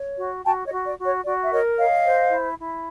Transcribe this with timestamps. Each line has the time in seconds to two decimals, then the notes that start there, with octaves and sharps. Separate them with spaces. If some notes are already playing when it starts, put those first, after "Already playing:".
Already playing: C#5
0.18 F#4
0.44 F#4 G5 A5
0.65 C#5 D#5
0.71 F#4
0.85 D5
0.98 F#4
1.05 C#5
1.24 F#4 D5
1.43 E5
1.51 A#4 C#5 D#5
1.78 C#5 D#5 F5
2.05 C5
2.31 E4
2.58 E4